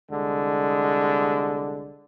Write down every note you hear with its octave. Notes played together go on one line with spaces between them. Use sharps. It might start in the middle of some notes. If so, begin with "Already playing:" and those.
C2 D3 G#3